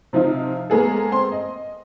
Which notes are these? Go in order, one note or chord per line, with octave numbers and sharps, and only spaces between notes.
C3 F3 D#4 F4
G#3 A#3 B3 G#4 A4
C4 C6
D#5